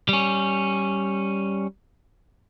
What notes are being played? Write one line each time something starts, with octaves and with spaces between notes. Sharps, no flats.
G3 C#4